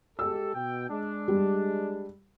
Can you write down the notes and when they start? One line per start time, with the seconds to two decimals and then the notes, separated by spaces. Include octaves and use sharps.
0.19 G#3 G4 A4 E6
0.55 B2 G5
0.90 G#3 D4
1.28 G3